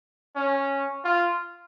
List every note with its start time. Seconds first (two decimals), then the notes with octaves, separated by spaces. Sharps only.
0.36 C#4
1.04 F4